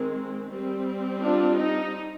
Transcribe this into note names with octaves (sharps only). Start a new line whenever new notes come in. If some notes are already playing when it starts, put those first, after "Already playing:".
Already playing: D#3 G#3 C4
G3 C4
D4 F4
D#4